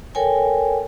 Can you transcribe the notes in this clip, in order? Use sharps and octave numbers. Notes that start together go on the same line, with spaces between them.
A4 A#4 C#5 G5 G#5